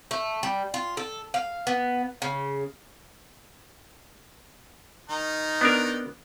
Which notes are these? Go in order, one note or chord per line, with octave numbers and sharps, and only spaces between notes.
A3
G3
F4
A4
F5
B3
C#3
D#3 D#4
B3 D4 A#4